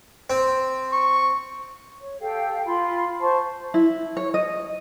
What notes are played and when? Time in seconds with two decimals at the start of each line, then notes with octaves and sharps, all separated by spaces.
0.30 C4
0.93 C#6
2.01 C#5
2.20 G4 A4 F5 G5
2.66 F4 B5 C6
3.20 C5 A5 C6 C#6
3.74 E4
4.17 C#5
4.34 D#5